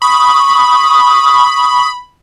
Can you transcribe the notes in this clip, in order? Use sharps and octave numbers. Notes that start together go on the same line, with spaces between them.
B5 C#6 D#6